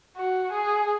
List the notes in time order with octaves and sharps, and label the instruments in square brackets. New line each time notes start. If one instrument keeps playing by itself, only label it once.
[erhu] F#4
G#4